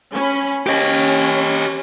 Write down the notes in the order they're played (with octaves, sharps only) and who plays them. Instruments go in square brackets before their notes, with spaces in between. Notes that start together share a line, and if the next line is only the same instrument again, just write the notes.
[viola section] C#4 B5
[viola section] C#4 [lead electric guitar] G4 D#5